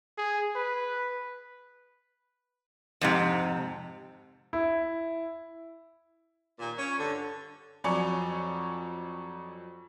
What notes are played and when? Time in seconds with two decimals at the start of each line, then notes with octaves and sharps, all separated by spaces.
0.18 G#4
0.56 B4
3.01 F2 G#2 C3
4.53 E4
6.59 D#2 A#2
6.78 C#4
6.98 G2 D3
7.84 F2 F#3 C#5 D5 G#5 C#7